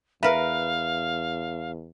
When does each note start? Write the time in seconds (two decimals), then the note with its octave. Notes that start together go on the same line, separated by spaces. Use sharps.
0.23 E2 A#4 B4 E5 F5